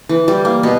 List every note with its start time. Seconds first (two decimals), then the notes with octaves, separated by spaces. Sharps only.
0.09 E3
0.28 G3
0.45 A#3
0.63 B2 B3